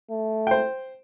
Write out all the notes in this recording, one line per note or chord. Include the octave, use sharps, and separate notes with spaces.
A3
C5 G5